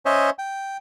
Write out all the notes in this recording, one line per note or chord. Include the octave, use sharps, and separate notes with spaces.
C#4 C5 C#5 D#5 E5
G5